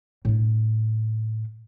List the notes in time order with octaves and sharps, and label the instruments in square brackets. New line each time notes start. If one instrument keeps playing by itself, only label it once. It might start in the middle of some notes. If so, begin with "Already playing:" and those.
[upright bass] A2 D4